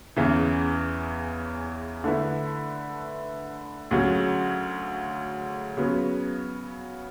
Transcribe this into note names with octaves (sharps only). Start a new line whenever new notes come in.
E2 C#3 E3
D3 A3 E4 B4
D2 C#3 F#3
C#3 F#3 B3